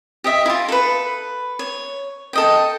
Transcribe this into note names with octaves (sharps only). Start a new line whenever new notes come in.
G4 D#5 E5
E4 F4
A4 B4
C#5
A4 D#5 G5